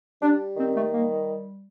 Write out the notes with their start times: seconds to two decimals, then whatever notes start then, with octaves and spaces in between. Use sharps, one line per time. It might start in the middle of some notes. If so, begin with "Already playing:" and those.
0.22 G3 D4
0.57 D#3 C4
0.74 A3
0.91 G3 A#3